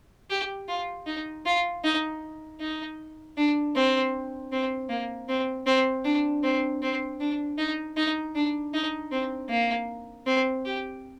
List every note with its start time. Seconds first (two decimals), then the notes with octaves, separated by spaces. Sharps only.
0.30 G4
0.68 F4
1.07 D#4
1.46 F4
1.84 D#4
2.60 D#4
3.37 D4
3.76 C4
4.52 C4
4.90 A#3
5.29 C4
5.67 C4
6.05 D4
6.44 C4
6.82 C4
7.20 D4
7.58 D#4
7.97 D#4
8.35 D4
8.74 D#4
9.12 C4
9.49 A#3
10.27 C4
10.65 G4